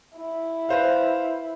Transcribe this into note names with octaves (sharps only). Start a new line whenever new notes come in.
E4
B4 C5 F5